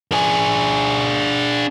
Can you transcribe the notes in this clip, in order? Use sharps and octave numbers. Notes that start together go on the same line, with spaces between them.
D4 G#4